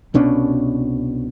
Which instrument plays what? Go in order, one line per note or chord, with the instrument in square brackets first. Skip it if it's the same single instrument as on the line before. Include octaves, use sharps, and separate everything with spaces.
[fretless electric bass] C2 B2 C#4 D4